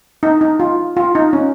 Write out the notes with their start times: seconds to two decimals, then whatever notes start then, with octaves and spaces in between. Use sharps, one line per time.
0.23 D#4
0.41 D#4
0.60 F4
0.97 F4
1.15 D#4
1.33 C#4